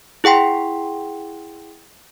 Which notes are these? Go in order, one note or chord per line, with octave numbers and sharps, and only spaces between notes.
E4 G#4 F#5 G5 C6